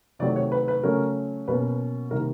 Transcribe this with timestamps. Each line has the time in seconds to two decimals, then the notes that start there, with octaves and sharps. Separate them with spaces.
0.19 C3 D#3 F#3 A3 C4 D5
0.36 C#5
0.52 B4
0.68 B4
0.83 C#3 F#3 A3 C#4 A#4
1.48 B2 F#3 A#3 C#4 B4
2.11 C3 D#3 G3 A#3 A#4